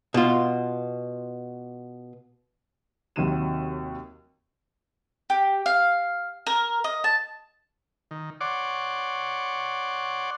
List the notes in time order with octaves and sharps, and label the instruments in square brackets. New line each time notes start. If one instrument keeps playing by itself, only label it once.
[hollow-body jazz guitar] B2 F4
[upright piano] D#2 C3 D#3 F#3 D#7 E7
[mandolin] G4
F5
A#4
D#5
A5
[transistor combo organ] D#3
C#5 D5 F#5 C6 D6